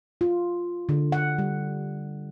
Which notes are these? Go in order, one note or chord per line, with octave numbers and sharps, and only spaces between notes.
F4
D3
F#5
G3